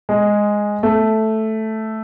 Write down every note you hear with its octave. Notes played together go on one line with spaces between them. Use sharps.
G#3
A3